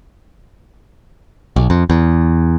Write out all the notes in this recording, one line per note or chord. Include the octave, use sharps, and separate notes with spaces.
B1
F2
E2